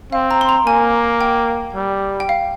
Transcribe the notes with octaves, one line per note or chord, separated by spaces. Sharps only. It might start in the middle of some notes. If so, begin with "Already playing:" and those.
C4 F5
A#5
C6
A#5
A#3 G#5
G5
G3
G5
F5